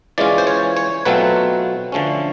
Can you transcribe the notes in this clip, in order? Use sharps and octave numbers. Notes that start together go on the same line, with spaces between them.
E3 G#3 C#4 F4 D5
C5
C#5
C#5
B2 F#3 A3 C4 F4 B4
D3 F3 A3 C#4